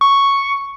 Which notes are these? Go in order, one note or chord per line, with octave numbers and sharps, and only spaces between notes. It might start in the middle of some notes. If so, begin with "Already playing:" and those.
C#6